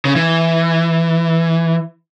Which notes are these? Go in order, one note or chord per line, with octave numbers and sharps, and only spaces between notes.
C#3
E3